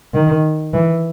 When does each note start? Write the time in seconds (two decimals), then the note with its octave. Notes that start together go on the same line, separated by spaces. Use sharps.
0.13 D#3
0.73 E3